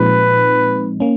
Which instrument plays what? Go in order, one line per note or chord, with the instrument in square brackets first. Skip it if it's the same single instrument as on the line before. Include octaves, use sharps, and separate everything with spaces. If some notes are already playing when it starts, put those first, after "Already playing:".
Already playing: [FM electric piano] A#2 F3 G#3 C4 D#4 [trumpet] B4
[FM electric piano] A#3 C#4